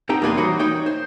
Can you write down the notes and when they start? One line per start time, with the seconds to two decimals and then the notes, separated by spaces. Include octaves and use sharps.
0.09 C4 D#4 G4 F#5 G5
0.22 E2 A#3 B4 D5 G#5 C6
0.37 E3 G3 D#4 F#4 C5 C#5
0.59 D#4 C#5 G5
0.86 C5